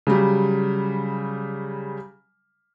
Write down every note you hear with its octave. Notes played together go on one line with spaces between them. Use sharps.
C#3 F#3 G3